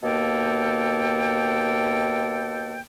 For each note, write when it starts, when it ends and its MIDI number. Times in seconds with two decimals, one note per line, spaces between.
0.03 2.79 39
0.03 2.79 47
0.03 2.79 58
0.03 2.79 69
0.03 2.79 79